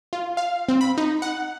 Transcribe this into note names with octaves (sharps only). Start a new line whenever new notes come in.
F4
F5
C4
B5
D#4
F#5